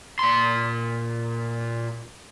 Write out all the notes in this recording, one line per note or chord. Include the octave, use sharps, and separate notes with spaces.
A#2 C6